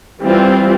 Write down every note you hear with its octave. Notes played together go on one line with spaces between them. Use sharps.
E3 G3 C4 F4